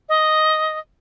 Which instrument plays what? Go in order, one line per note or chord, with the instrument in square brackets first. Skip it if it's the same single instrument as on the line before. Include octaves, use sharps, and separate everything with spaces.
[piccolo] D#5